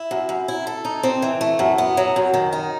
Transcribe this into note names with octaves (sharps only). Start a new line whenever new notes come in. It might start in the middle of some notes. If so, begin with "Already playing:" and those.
Already playing: E4
F#2
F#2
E4
A4
D#4
C4
E3
A3
F#2
B3
F#3
F#2
D#3
D#4